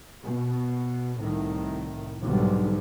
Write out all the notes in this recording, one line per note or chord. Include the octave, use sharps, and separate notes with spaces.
B2
C2 A2 D#3
B1 G#2 D3 G3